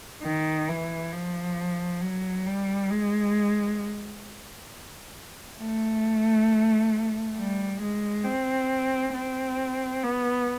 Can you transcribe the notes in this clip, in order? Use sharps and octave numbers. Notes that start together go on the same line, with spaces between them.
D#3
E3
F3
F#3
G3
G#3
A3
G3
G#3
C4
C4
B3